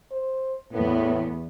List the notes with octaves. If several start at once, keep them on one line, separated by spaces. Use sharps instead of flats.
C5
E2 A2 B3